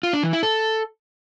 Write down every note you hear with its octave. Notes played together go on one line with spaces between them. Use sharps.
F4
D4
E3
E4
A4